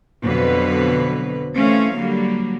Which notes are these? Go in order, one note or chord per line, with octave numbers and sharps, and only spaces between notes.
F2 B2 D3 F#3 B4
E3 A3 C4 C#4 F5
D3 F#3 G3 A#3